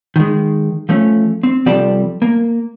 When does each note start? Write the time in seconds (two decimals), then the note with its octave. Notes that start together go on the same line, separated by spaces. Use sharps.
0.16 D#3 G#3
0.89 F3 A3 C#4
1.43 C4
1.66 C2 F3 G3 C4 A4 D5
2.22 A#3